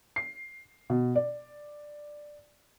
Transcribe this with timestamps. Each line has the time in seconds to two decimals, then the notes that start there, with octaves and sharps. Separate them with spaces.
0.16 C7
0.90 B2
1.16 D5